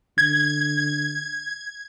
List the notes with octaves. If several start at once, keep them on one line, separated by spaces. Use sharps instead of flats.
D3 G#6